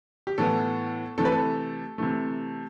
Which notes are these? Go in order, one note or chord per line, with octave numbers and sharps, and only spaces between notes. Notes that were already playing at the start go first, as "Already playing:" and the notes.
G4
A2 E3 B3 A4
C3 E3 A3 A4
B4
A4
C3 E3 A3